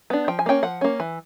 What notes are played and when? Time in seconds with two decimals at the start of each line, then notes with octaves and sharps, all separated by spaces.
0.10 B3 D4
0.28 F3 G5
0.39 G#5
0.46 A#3 C#4 G5
0.63 F3 F#5
0.81 A#3 C#4
1.00 E3